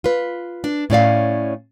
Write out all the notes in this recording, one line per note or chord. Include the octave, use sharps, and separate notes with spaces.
F4 B4
D4
A2 C#4 D5 F5